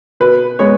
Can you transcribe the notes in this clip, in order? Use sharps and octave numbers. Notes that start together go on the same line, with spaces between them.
B2 B4
G#3 B3 C#5